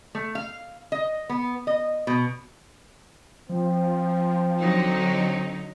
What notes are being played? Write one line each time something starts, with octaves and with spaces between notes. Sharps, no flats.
A3
F5
D#5
B3
D#5
B2
F3 C4
D3 F#3 D#4